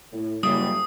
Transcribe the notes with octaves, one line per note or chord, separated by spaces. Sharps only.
A2
F#1 G3 D#6